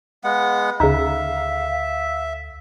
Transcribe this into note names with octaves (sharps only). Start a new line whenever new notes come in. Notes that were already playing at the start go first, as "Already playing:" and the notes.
G#3 B3 F5 F#5
D2 C#3 D#4 E5 F5